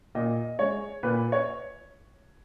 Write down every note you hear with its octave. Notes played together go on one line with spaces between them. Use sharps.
A#2 D#5
G#3 C#5
A#2 B4
C#5